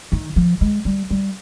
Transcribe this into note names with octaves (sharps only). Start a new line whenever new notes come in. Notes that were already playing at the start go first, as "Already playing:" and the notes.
D#3
F3
G#3
G3
G3